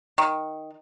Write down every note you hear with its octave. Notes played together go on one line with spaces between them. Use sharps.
D#3